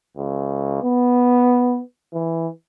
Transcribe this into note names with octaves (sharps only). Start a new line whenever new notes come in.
C#2
B3
E3